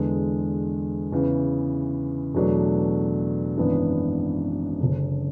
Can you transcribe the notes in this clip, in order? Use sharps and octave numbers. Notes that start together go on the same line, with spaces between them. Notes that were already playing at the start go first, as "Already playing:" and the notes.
Already playing: E2 D3 G#3
E2 C#3 E3
E2 B2 F#3 A3 D4
G#1 F#2 E3 B3 D4
F#1 F#2 D3